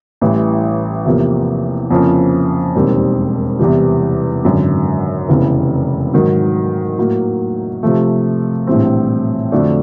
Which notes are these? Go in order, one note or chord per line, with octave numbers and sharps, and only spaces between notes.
A1 A2 E3 G3
E2 C3 F3 A#3
F2 C#3 F3 A#3 C#4
E1 D#2 D#3 G3 C4
E2 C3 E3 G3
G#1 F#2 D3
F1 E2 C#3 E3
G#2 D#3 F#3
A2 F#3 A#3
C3 F3 A3
A#1 A2 E3 G3 C4
F2 D3 F#3 A3 D4